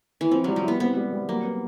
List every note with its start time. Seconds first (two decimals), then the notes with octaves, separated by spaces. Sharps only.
0.21 E3
0.31 F3 C4
0.44 F#3 G3
0.56 F3
0.64 B3 E4
0.80 B3 C4
0.96 G3
1.13 G3
1.28 F#3 A#3
1.45 B3